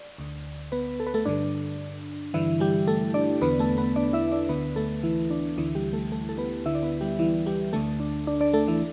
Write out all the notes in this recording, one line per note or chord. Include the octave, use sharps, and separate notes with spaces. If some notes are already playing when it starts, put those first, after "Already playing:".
Already playing: D5
D2 D3
B3 B4
A4
B4
A3 A4
G2 D3 D4
G2 D3 E3 E4
G3 G4
A3 A4
D4 D5
E2 D3 B3 B4
A3 A4
B3 B4
D4 D5
E4 E5
D4 D5
D2 D3 B3 B4
A3 A4
E3 E4
D4
D2 D3 E3 E4
G3 G4
A3 A4
A3 A4
A4
B3 B4
D2 D3 E4 E5
D5
B3 B4
G3 G4
E3 E4
G3 G4
D2 D3 A3 A4
D4
D4
D4 D5
A3 A4
E3 E4